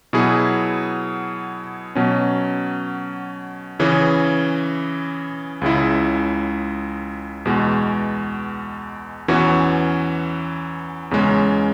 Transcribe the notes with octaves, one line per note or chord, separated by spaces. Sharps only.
B2 F#3 E4 G#4
B2 F#3 C#4
C#3 E3 C#4 G#4
C#2 C#3 G#3 E4
E2 B2 G#3
E2 E3 C#4 F#4
E2 C#3 G#3 C#4